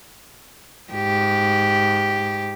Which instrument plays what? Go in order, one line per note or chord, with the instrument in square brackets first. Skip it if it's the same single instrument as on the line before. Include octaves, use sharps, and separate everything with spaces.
[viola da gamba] G#2 G4